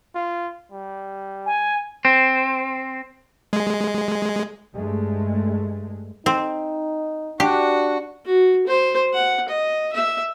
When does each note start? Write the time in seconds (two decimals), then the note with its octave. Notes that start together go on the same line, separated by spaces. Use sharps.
0.15 F4
0.72 G3
1.46 G#5
2.05 C4
3.53 G#3
4.73 G2 G#3 A3
6.26 C4 D#4
7.40 D4 F#4 G4
8.26 F#4
8.67 C5
9.14 F#5
9.49 D#5
9.93 E5